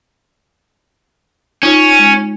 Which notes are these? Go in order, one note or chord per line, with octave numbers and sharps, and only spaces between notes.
C#4 D#4 F4 C#5
G#3